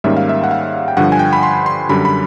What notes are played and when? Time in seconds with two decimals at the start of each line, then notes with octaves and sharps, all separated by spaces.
0.04 G#2 D#3 G3 A#3 C#4 E5
0.17 F5
0.29 E5
0.44 F#5
0.51 F5
0.88 G5
0.97 G2 D3 F3 F#5
1.12 G#5
1.19 G5
1.33 B5
1.43 C6
1.66 C6
1.89 F#2 D3 G3 B5
2.05 B5